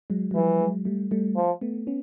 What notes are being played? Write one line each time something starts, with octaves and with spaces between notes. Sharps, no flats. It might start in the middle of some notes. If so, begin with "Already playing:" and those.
F#3 G#3
F#3
E3 F3 G3
F#3 G#3
G3 A3
G3 A3
F3
A3 B3
B3 C#4